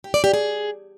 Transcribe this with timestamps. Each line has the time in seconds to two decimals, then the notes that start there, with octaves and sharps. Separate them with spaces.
0.04 G4
0.14 D5
0.24 G4
0.34 G#4